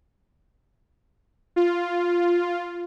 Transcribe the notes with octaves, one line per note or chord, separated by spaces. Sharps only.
F4